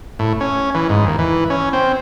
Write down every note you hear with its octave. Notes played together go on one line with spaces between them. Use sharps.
A2
C#4
E3
G#2
D#2
E3
C#4
C4